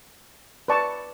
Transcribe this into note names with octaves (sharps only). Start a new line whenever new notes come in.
B4 D5 A5 C#6